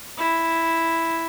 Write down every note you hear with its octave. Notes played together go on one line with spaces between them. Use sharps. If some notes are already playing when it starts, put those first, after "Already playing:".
E4